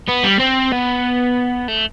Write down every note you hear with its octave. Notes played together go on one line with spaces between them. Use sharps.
B3
G3
C4
B3
A3